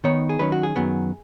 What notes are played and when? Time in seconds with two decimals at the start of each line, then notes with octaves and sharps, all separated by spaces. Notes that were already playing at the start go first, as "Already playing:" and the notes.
0.04 D#3 B3 D#4 C#5
0.29 G#4
0.39 D#3 F#3 C#4 B4
0.52 F#4
0.63 G#4
0.76 F#2 D#3 F#3 B3